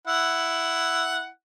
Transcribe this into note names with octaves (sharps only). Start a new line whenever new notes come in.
E4 F#5